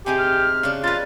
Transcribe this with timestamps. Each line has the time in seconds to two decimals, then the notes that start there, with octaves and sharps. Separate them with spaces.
0.06 C3 D#4 G4 G#4 G#5
0.18 F6
0.63 C#3 D4
0.84 D#4 F4 B4 A6